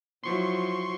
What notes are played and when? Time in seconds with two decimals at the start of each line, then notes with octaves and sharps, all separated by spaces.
0.23 F3 F#3 E4 C6 C#6